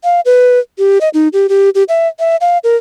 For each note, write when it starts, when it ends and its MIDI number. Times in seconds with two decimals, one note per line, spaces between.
0.04 0.20 77
0.25 0.59 71
0.78 0.98 67
1.01 1.09 75
1.14 1.28 63
1.33 1.47 67
1.49 1.70 67
1.75 1.83 67
1.89 2.08 76
2.19 2.36 76
2.41 2.58 77
2.64 2.76 70